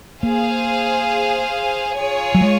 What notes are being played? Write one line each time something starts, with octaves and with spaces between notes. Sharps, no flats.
A#3 G#4 C5 F5
F4 G#4 C#5 G#5
F#3
G#3